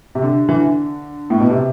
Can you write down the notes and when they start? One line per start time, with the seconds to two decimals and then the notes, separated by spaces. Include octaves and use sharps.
0.15 C3
0.22 D3
0.49 E3
0.54 D3
1.30 A2
1.40 B2
1.50 C3